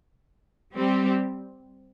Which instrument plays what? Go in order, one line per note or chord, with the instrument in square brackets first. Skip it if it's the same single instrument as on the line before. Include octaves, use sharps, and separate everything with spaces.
[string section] G3 C4 G4